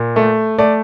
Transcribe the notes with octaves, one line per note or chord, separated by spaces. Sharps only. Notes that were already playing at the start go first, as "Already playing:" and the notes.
Already playing: A#2
A3
A3 D5